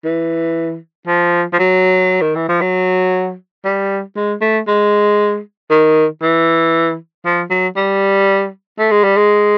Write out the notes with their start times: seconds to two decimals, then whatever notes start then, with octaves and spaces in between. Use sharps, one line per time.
0.04 E3
1.07 F3
1.53 F3
1.59 F#3
2.21 D#3
2.36 E3
2.49 F3
2.61 F#3
3.65 G3
4.16 G#3
4.41 A3
4.67 G#3
5.70 D#3
6.22 E3
7.25 F3
7.50 F#3
7.76 G3
8.79 A3
8.91 G#3
9.04 G3
9.17 G#3